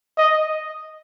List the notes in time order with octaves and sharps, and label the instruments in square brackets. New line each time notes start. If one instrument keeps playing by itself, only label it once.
[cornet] D#5